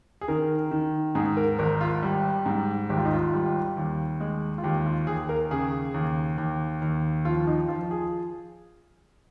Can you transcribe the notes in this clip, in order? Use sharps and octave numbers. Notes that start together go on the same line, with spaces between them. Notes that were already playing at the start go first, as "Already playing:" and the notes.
G#4
D#3 A#4
D#3
G#2 G#4
A#4
G#1 A#4
F4
G3
G#2
G#1 G4
F4
D#4
F4
G3
D#2
G#3
F4
D#2 G4
F4
D#2 G#4
A#4
C#3 G#4
D#2
D#2
D#2
F3 F4
D#4
F3 F4
G#4